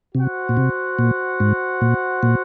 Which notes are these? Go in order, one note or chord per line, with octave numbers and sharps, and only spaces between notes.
C3 F#4 C5 F#5
A#2
C3
A#2
G#2
A#2
A#2